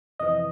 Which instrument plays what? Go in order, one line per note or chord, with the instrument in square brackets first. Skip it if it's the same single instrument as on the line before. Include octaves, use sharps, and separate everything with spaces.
[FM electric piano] F2 C3 E3 D#5